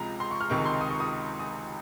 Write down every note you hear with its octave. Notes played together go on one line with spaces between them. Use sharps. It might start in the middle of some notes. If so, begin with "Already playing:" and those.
Already playing: C#2 C3 F3 G#3 A#5
C6
C#6
F6
C#2 C3 D#3 G#3 C#6
C6
D#6
C#6
D#6
D#6